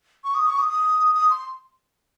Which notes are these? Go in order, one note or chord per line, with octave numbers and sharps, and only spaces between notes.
C#6
D#6
C#6
D#6
D#6
D#6
C6